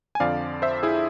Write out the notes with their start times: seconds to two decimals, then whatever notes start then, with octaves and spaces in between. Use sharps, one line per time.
0.15 G#5
0.20 F2 D3 F3 D5 F5
0.62 C5 E5
0.83 E4 G#4